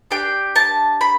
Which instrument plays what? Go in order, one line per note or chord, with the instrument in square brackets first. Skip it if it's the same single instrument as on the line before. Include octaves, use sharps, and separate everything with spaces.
[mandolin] D4 G4 G5
A5
B5